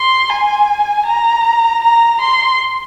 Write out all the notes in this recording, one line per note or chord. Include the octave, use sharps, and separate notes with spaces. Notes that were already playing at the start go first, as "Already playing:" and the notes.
Already playing: C6
G#5
A#5
A#5
C6